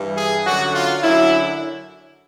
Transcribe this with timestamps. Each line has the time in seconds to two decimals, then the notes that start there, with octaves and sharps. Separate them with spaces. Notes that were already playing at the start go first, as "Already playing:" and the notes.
Already playing: G2 E3 G3
0.17 G#4
0.46 F#2 D3 F#3 F#4
0.74 F4
1.03 F#2 D3 F#3 E4